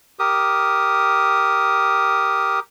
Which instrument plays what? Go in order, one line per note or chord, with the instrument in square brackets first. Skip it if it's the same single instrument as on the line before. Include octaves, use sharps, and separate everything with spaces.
[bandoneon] G4 A#4 D#6